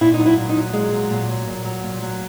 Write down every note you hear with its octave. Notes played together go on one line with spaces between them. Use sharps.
A#2 E4
D#4
F#3
E4
A#2
D#4
F#3
A#2 G#3
F#3
A#2
F#3
A#2
F#3
A#2
F#3